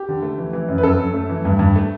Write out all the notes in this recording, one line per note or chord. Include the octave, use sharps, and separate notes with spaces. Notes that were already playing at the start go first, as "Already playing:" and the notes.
Already playing: G4
D3
A3
E3
E3
F#2
B4
F#2 A4
F#2
A3
E3
G2
G2
A3